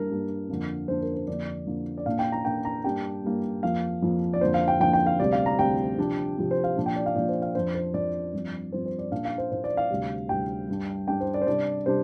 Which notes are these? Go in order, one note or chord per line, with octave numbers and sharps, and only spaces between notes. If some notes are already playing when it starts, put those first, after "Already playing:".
Already playing: G2 G3 A#3 D4 A#4
G2 G3 A#3 D4
F2 D3 A#3 D4
F2 D3 A#3 D4 C5
A#4
C5
F2 D3 A#3 D5
F2 D3 A#3
D5
A#2 A#3 D4 F5
G5
A#5
A#2 A#3 D4 G5
A#5
G2 G3 A#3 D4 G5
G2 G3 A#3 D4
F2 F3 A#3 F5
F2 F3 A#3
D5
F2 D3 A#3 C5
F5
G5
F2 D3 A#3 G5
G5
F5
D2 C3 G3 C4 D5
F5
A#5
D2 C3 G3 C4 G5
C3 F3 D4
C3 F3 D4
C5
F5
A#2 F3 D4
G5
D5
F5
A#2 F3 D4 D5
C5
F5
F2 F3 D4 C5
C5
F2 F3 D4 D5
G2 F3 C4
G2 F3 C4 C5
C5
D5
A#2 A#3 D4 F5
F5
C5
A#2 A#3 D4 C5
D5
F5
D2 C3 G3
D2 C3 G3 G5
G2 G3 D4
G2 G3 D4 G5
C5
D5
C5
C3 G3 D4 D5
C3 G3 D4 C5